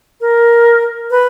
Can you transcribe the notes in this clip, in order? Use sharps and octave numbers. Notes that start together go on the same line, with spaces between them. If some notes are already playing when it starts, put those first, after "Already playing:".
A#4
B4